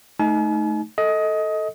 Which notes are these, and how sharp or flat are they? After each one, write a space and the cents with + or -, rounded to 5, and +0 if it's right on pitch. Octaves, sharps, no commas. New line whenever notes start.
A3 -15 D#4 +0 G#5 +45
A4 +0 D#5 +20